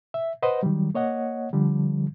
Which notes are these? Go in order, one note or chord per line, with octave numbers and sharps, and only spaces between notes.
E5
B4 C5 D#5 F#5
D#3 F#3 G3
A#3 C#5 D#5 F#5
D3 F3 G3